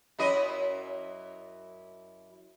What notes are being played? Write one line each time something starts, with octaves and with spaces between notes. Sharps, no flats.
F#2 E4 D#5